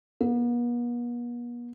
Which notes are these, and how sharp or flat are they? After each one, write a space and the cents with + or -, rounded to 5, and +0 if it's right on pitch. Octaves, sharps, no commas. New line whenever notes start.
B3 -45